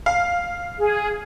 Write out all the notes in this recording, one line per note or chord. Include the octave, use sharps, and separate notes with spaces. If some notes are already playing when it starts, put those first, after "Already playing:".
F5
G#4